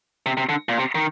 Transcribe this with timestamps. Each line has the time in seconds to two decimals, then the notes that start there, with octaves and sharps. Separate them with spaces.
0.26 C3
0.37 C3
0.49 D3
0.69 A#2
0.78 C3
0.95 D#3